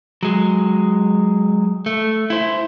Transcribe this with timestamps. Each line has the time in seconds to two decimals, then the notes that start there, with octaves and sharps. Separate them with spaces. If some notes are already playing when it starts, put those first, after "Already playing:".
0.23 F#3 G#3
1.86 A3
2.30 E4 C5